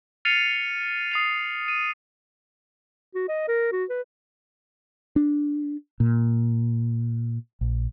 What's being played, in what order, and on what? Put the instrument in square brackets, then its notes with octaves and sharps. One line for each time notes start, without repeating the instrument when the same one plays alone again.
[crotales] F6 A6 C7 C#7 D#7 F7
D#6 C7 F7
D#7
[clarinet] F#4
D#5
A#4
F#4
B4
[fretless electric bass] D4
A#2
A#1